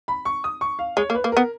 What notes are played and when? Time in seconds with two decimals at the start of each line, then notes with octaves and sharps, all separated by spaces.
0.08 B5
0.25 C#6
0.44 D#6
0.61 C#6
0.79 F5
0.97 G#3 C#5
1.10 A#3
1.15 B4
1.24 A#3
1.32 B3 A#4